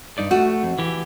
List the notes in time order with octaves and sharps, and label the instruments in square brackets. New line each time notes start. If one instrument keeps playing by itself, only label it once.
[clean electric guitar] G2 D#4 D5
[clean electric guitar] A3 [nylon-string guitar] F#4
[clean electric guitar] F2
E3 G4